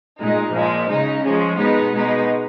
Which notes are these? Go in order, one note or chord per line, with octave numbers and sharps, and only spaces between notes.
A#2 G#3 D#4
A#2 F3 G#3
C#3 G#3 D#4
F3 G#3 C#4
B2 G#3 B3 D#4
B2 G#3 B3 D#4